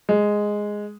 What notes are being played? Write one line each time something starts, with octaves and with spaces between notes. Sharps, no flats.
G#3